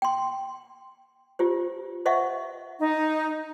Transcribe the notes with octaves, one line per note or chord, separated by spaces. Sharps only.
G5 C6
F4 G4 C5
C5 D#5 E5 F#5 C#6
D#4